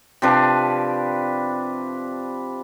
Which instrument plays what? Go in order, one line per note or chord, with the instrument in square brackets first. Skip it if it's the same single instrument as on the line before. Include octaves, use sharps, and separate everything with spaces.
[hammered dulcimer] C3 F3 D4 B4